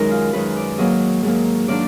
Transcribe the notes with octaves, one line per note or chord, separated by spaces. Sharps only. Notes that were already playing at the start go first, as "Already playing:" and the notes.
Already playing: F#2 D#3 G#3 D#4 A#4
F4
F#2 D#3 G#3 D#4 B4
D5
G#2 F#3 A#3 D#5
G#2 F#3 A#3
D#3 F#3 A#3 D4 D5